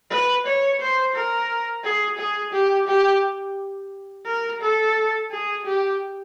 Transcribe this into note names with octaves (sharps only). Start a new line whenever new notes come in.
B4
C#5
C5
A#4
G#4
G#4
G4
G4
A#4
A4
G#4
G4